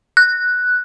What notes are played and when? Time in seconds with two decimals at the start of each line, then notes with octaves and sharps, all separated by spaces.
0.17 F#6